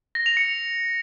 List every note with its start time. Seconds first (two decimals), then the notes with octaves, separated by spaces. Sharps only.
0.15 A#6
0.26 F7
0.37 C#7